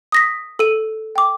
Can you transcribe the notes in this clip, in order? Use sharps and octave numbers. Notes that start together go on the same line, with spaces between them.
D#6 A#6 B6
A4 D#7
G5 D6